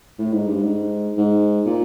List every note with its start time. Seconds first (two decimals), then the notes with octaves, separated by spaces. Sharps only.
0.19 A2
0.33 G#2
0.47 G2
0.61 G#2
1.17 G#2
1.66 A#2